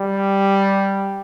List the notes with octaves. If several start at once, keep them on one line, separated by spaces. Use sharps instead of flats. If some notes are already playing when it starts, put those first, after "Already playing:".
Already playing: G3